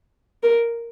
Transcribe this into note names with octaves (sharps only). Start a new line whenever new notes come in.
A#4